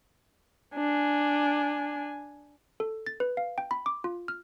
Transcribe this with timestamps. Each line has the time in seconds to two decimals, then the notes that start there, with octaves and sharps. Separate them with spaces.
0.75 D4 G#5
2.80 A4
3.06 A6
3.20 B4
3.37 F5
3.58 G5
3.71 B5
3.86 D6
4.04 F4
4.28 F6